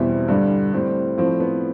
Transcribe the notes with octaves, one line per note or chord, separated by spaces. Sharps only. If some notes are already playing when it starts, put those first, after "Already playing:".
Already playing: E2 B2 G3 C4 E4
G2 D3 G3
A2 G3 C4
A2 F3 C4
B3